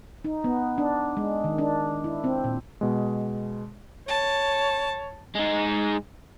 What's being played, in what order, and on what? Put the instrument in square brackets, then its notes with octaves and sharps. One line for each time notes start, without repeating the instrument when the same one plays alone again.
[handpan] D#4
B3
D4
G#3
D#3
D4
E4
C4
A#2
[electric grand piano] B2 G#3
[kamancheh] C#5 [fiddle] A5
[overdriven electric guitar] G#3 D#4